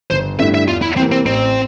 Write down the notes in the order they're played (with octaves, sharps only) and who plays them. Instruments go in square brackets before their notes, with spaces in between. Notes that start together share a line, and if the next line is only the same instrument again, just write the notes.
[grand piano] G1 [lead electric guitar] C5
[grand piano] G2 D3 A3 E4 [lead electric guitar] E5
[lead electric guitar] E5
[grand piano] E2 [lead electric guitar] F4
[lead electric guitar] E4
[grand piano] C3 E3 A#3 [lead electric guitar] C4
[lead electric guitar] C4
[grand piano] A1 [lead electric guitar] C4